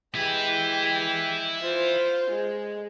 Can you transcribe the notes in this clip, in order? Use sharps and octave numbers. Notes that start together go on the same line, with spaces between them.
G#3 E4 G4 B4
F4 C5
G#3